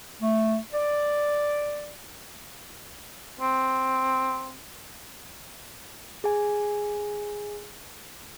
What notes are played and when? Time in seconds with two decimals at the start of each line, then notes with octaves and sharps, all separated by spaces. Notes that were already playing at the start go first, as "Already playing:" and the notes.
0.20 A3
0.73 D5
3.41 C4
6.24 G#4 G#5